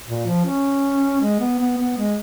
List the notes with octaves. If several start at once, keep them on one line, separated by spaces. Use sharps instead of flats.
A#2
F3
C#4
G#3
B3
B3
B3
G#3